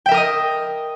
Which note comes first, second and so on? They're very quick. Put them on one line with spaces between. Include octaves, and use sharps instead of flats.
G5 E5 A#4 D#6 D#5